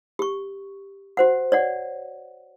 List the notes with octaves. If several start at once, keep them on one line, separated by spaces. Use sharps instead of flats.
G4 C#6
F#4 C5 F#5
C#5 D5 F#5